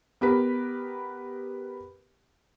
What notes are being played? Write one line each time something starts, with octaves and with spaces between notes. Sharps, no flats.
B3 G4 A#4 B4